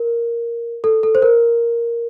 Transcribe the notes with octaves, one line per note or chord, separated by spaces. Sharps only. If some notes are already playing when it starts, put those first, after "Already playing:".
Already playing: A#4
A4
A4
C5
A#4